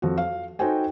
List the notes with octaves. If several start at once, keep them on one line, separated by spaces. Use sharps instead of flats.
F2 F#4
F5
D#4 F#4 A4 C5 G5 G#5